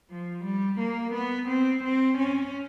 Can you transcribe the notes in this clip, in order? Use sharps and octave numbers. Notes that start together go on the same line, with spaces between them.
F3
G3
A#3
B3
C4
C4
C#4